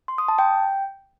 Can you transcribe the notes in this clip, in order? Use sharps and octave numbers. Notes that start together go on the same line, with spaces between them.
C6
D#6
A5
G5